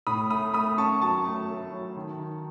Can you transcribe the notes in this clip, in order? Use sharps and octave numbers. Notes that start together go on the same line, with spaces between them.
A2 B5 D#6
A3 B5 D#6
A3 B5 D#6
C#4 A5 C#6
F#3 A5 C#6
A3
A3
F#3
D#3
D#3